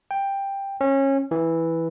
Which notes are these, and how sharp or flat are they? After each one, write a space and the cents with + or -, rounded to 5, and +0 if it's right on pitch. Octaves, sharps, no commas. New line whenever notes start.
G5 +10
C#4 -25
E3 -5